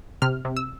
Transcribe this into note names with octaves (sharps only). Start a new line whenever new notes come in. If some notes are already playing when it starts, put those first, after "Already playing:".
C3 F6
C3
E6